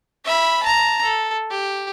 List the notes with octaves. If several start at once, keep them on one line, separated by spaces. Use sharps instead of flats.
E5 B5
A5 A#5
A4
G4